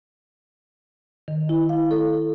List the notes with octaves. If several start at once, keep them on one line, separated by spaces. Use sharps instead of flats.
D#3
E4
F5
A4